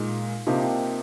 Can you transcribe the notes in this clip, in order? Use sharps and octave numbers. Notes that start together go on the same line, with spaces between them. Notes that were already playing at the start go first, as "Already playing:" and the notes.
Already playing: A#2 G#3 D#4 G#4
C3 F3 A#3 D#4 G4